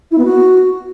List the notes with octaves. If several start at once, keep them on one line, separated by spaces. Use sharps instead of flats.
E4
B3
F#4